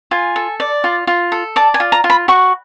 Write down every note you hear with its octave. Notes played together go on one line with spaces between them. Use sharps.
F4 G#5
A4
D5
F4
F4
A4
D5 A5
G#5
F4
A#5
F4
B5
F#4 C#6